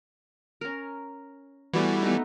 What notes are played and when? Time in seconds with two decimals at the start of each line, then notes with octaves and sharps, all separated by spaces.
0.61 C#4 A#4
1.74 E3 G3 A3 B3 F#4
2.02 A3 B3 D#4